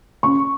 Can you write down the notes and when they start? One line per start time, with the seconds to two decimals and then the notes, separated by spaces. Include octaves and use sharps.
0.23 C#3 C#6